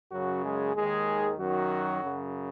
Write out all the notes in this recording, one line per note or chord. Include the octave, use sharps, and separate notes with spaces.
F#2 C#3 F#3 F#4
G#3 G#4
D#2 D#3 G#3 G#4
F#2 D#3 F#3 F#4
F#2 C#3